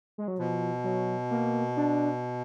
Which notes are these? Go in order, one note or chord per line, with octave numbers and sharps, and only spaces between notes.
G#3
F#3
B2 F3
F#3
A#3
D4